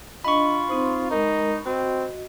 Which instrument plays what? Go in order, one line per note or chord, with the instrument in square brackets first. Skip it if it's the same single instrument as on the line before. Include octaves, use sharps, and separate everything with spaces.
[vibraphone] D4 D#5 [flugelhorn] F4 [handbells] B5 C#6
[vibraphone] C4 D#4 C5
[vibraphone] G#3 A#4 [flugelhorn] D#4
[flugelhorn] C4 [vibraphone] F#4 D#5